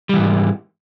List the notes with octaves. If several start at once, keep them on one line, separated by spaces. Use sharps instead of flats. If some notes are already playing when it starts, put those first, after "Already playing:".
G#2 E3 G3